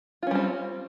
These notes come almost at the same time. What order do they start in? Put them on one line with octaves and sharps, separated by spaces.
F4 C#4 G3 C4